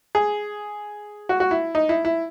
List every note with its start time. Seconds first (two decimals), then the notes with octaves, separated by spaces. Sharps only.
0.15 G#4
1.29 F#4
1.40 F#4
1.51 E4
1.75 D#4
1.89 E4
2.05 E4